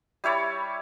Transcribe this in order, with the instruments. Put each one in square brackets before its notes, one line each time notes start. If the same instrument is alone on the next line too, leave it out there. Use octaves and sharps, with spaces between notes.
[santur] G3 E4 C#5 D5